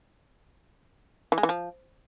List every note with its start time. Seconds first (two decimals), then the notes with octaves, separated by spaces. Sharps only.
1.32 E3
1.38 G#3
1.43 E3
1.49 F3